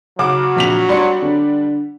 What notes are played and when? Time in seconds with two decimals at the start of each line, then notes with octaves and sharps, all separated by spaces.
0.19 C#3 F#3 F#5 D6
0.56 A#1 B6 F7
0.89 G3 D4 C6 C#7
1.22 D3